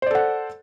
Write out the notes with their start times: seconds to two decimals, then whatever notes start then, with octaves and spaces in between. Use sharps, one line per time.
0.02 C5
0.06 D5
0.11 A4
0.15 F#5